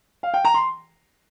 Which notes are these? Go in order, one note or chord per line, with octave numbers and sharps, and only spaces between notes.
F5
G5
A#5
C6